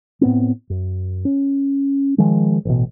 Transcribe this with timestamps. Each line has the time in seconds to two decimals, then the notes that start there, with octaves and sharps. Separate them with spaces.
0.21 A2 B3 C4
0.70 F#2
1.25 C#4
2.18 D#3 F3 G#3
2.65 A1 B2